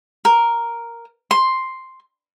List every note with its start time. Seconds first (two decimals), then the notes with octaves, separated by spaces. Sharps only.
0.25 A#4
1.31 C6